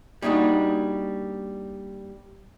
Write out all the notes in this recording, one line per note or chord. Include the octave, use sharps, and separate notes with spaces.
G3 A#3 D4 D#4 F#4